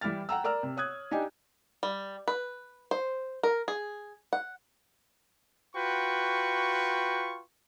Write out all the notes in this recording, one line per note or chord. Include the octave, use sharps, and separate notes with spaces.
E3 G3 E4 G4 F6 A6
F#5 G5 A#5 E6
A#4 D5 A#5 E6 F6
C3
C#5 D#6 F#6 G#6
D4 D#4 G4 D#5 G#5
G3
B4
C5
A#4
G#4
F#5
F4 F#4 B4 G5 C#6